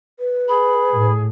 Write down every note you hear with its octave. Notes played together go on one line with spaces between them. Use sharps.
B4
G#4 B5
A2